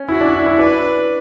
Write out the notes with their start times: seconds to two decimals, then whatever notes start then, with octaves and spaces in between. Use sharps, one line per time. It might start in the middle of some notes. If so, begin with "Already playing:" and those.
Already playing: C#4
0.08 E4 F#4
0.21 D4
0.33 E4
0.46 E4
0.59 D4 B4